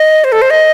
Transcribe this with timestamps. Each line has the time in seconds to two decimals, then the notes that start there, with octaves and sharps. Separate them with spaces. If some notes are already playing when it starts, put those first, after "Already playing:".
Already playing: D#5
0.24 C5
0.32 A4
0.42 C5
0.50 D#5